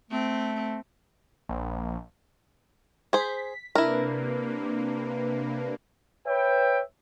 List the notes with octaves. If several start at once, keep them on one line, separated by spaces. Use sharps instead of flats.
A3 C4
A#1
G#4 C5 B6
C3 A#3 D4 E4 A#4 B4
B4 C#5 E5 G5